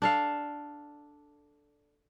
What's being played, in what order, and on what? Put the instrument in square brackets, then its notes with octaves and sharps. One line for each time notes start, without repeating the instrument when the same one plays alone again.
[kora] D4 A4 F5